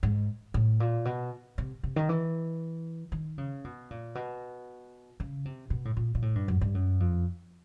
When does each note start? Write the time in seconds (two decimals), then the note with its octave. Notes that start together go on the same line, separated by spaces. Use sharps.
0.03 G#2
0.54 A2
0.80 A#2
1.05 B2
1.58 C3
1.83 C3
1.96 D#3
2.09 E3
3.12 D#3
3.38 C#3
3.64 B2
3.91 A#2
4.15 B2
5.20 C#3
5.45 C3
5.70 B2
5.85 A2
5.97 A#2
6.15 A#2
6.22 A2
6.35 G2
6.48 F#2
6.61 G2
6.75 F#2
7.00 F2